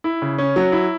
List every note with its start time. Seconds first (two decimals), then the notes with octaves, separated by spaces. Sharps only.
0.04 E4
0.22 C#3
0.38 C#4
0.56 F#3
0.72 E4